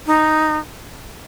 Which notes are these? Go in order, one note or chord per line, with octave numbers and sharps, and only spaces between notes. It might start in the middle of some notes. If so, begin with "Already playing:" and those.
D#4